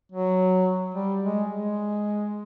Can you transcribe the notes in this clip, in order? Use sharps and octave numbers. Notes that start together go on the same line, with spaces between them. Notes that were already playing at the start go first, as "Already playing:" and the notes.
F#3
G3
G#3
G#3